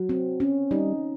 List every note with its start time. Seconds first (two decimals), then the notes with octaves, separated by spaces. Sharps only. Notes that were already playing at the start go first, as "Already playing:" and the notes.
Already playing: F#3
0.09 C4
0.40 C#4
0.71 G3 D#4